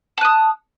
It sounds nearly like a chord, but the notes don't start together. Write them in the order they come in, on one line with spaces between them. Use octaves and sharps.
A5 F#6 D#6